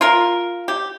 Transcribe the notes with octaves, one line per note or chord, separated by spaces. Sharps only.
F4 A#4
G4